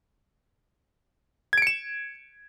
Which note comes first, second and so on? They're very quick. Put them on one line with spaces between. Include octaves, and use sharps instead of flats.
G#6 D7 C#7 E7